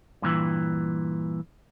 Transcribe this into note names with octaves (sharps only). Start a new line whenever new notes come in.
G2 A#2 D#3 E3